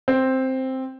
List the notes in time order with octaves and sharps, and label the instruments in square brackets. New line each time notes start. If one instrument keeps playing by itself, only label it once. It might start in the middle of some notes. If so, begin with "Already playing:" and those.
[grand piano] C4